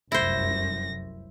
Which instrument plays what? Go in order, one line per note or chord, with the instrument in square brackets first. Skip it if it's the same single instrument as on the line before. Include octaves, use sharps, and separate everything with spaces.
[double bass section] F1 C2 F#2 [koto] E4 C5 [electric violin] A#6